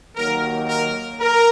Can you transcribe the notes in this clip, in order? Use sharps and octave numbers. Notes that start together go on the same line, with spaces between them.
D#2 D#3 F#3 A#3 A#4
A#4
A#4